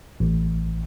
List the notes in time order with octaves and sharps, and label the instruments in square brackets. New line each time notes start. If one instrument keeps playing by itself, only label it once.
[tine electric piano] A1